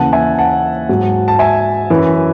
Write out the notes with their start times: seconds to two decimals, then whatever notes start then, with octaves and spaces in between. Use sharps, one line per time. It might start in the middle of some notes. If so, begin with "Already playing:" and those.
Already playing: D#2 C#3 E3 F#5 A5
0.13 E5 G#5
0.38 F#5 A5
0.89 G#2 F#3
1.28 A5
1.39 E5 G#5
1.90 F#2 E3